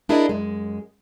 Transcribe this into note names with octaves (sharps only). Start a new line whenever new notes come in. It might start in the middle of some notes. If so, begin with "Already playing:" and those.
D4 E4 G#4 A#4 D5 D#5
F#2 G#3